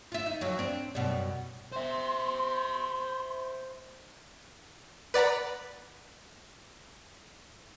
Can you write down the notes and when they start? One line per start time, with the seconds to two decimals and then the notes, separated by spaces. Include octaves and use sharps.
0.12 F4 E5
0.26 D#4
0.41 F2 F#3
0.59 C4 D4
0.95 F#2 B2 G3
1.72 C5 E5 C6
5.14 B4 D5 F#5 A#5 B5